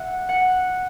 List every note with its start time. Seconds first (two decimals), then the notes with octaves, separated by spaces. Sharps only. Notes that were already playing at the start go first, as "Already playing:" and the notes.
Already playing: E5 F#5
0.29 F#5